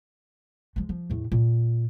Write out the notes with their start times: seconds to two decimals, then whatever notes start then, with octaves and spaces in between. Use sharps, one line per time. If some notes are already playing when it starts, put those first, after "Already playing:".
0.76 F3 G#3
0.89 F3
1.10 E2 A2
1.32 A#2